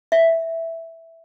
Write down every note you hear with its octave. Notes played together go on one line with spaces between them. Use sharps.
E5